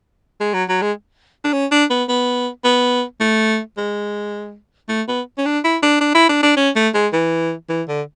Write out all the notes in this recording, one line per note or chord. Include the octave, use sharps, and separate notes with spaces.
G#3
F#3
F#3
G#3
D4
C#4
D4
B3
B3
B3
A3
G#3
A3
B3
C#4
D4
E4
D4
D4
E4
D4
D4
C#4
A3
G#3
E3
E3
D3